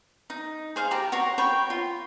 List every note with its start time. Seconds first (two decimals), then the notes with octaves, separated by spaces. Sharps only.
0.30 D#4
0.76 G#4 C5 F5
0.91 G4 A5 A#5
1.12 F#4 C#5 A#5 C6
1.38 C#5 G5 B5
1.70 F4